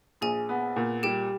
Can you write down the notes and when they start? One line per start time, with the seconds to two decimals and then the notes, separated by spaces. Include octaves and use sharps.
0.21 A#1 G#4 G#5
0.49 B3
0.76 A#2
1.03 G3 G4 G5